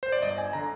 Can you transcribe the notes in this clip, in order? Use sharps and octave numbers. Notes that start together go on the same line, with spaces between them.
C5
D5
G1 D#5
G#5
D3 A#5